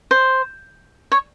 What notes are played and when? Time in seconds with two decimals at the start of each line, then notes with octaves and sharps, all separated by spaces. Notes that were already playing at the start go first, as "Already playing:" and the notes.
0.11 C5
1.12 C#5